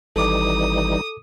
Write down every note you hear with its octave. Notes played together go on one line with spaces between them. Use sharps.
G#1 E3 G3 D#4 A4 D6 D#6